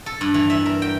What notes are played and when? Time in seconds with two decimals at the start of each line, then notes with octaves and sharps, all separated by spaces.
0.06 A4
0.21 G2
0.34 E3
0.50 E5
0.66 A#4
0.82 G5